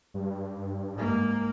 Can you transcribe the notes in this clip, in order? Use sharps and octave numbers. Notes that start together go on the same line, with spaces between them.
G2
G#2 A#3